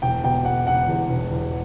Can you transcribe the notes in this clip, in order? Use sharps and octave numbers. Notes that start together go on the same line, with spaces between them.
E1 G5
B2 G5
B2 F#5
E1 F#5
E2
E1
E2